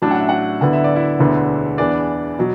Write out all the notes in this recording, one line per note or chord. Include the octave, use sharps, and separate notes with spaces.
A1 A2 F#3 D4 A5
F#5
E5
F#4 F#5
D2 D3 B3 E4 F#5
E5
D5
E4 E5
E1 D2 D3 B3 E4
E2 E3 B3 D4 D5
B2 F#3